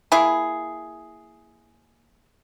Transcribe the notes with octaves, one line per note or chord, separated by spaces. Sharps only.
A#3 E4 G#4